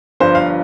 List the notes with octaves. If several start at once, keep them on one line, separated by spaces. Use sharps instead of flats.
G1 G2 F3 C5
F5